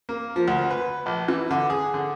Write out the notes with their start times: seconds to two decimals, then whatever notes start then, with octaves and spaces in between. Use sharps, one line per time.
0.09 A#3
0.36 F3
0.48 D2
0.70 B4
1.06 A#1
1.28 E3
1.51 D3
1.70 G#4
1.94 D3